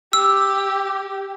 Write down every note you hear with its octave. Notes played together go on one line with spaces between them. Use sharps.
G4 E6